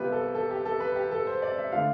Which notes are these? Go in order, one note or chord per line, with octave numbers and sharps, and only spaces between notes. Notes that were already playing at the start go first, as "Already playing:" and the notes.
Already playing: C2 C3 G3 B3 F4 B4
A4
A4
G4
A4
B4
G4
A4
C5
D5
E5
D3 A3 D4 F4 F5